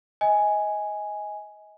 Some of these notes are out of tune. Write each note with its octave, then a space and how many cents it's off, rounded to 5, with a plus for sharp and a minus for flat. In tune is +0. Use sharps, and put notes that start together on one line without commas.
D#5 +25 G#5 +0